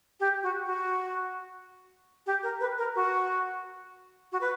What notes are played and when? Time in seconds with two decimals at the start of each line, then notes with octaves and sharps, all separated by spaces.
0.20 G4
0.43 F#4
0.66 F#4
2.26 G4
2.43 A#4
2.61 B4
2.78 A#4
2.96 F#4
4.32 F#4
4.41 B4